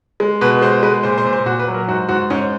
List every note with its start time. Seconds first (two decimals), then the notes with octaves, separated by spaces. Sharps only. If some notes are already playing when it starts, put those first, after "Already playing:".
0.20 G#3
0.41 B2 B4
0.61 G#3 C5
0.83 G#3 B4
1.03 A#2 C5
1.18 C5
1.25 A#2
1.33 C5
1.46 A#2 F#4
1.59 B4
1.68 F#3
1.74 A#4
1.88 G#2 F#4
2.09 G#2 F#4
2.30 G#2 C#4